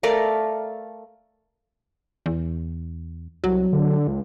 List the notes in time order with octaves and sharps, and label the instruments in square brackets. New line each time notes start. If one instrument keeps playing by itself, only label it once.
[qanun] A3 A#4 D5 F5
[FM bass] E2
[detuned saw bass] C2 [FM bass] F#3
[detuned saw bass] D3
C#2